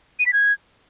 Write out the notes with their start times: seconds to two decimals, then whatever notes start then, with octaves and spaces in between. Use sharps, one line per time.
0.20 D#7
0.26 B6
0.33 G#6